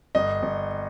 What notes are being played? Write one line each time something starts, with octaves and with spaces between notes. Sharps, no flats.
G1 D#5
G1